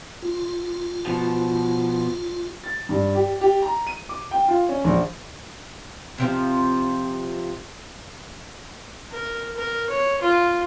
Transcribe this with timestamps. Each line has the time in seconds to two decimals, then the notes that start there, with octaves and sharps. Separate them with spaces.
0.22 F4
1.06 B2 F3
2.64 A6
2.89 G2
3.15 G4
3.41 G4
3.62 A#5
3.87 D#7
4.09 D6
4.31 G5
4.48 F4
4.69 C#4
4.85 A#1
6.18 C3 E3 F3
9.11 A#4
9.57 A#4
9.89 C#5
10.22 F4